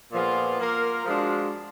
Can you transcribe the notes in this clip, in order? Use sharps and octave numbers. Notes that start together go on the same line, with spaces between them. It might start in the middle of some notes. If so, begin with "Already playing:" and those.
A#2 F3 B3 F4 G#4
A#3 F4 A#4
F3 G#3 D4 F#4